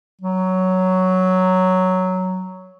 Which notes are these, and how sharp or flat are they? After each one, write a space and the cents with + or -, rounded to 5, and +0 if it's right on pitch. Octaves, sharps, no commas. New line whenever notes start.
F#3 +5